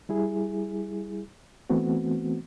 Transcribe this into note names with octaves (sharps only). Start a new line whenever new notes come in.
G3 E4 G#4
E3 A3 B3 C4 F#4